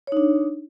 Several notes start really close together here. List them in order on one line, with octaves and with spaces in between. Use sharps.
C#5 D#4 D4